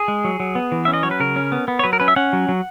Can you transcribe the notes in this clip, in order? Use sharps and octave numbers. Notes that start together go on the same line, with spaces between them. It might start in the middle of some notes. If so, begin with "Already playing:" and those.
Already playing: G#4
G#3
F#3
F#3
B3
E3
C#4 E5
D#5
F#3 C#5
B4
C#3 A#4
C#4
B3
B3
C#5
F#3 B4
A#4
C#4 B4
E5
C#4 F#5
F#3
F#3